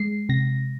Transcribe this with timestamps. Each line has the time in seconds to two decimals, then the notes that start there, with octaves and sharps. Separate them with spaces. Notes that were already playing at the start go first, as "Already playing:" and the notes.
Already playing: G#3 C7
0.29 C3 A#6